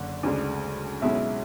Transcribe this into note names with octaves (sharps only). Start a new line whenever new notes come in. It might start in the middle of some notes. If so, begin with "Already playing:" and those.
Already playing: F#1 D3
D2 C#3 G#3 D4
B1 B2 G#3 C#4 E4